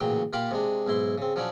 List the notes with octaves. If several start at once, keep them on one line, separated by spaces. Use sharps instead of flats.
A1 A#2 C#3 F#3 G5
A#2 F4 G4 F5 B5 D6
C3 G#3 D4
B1 G#2 E4 C6
C#3 C4
F3 F#3 C#4 D4 D5